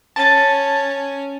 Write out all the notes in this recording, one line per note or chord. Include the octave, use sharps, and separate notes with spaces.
C#4 A5 A6